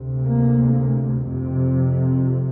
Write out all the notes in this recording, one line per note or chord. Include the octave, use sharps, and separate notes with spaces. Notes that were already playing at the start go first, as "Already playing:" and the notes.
Already playing: D2 C3
A#3
F2 C3